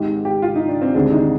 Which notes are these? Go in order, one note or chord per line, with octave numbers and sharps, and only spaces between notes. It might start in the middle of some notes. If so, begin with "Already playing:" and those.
Already playing: G#1 G#2 D#3 G#3 G4
G4
F4
D#4
D4
C4
D2 C3 D#3 G#3 D4
D#4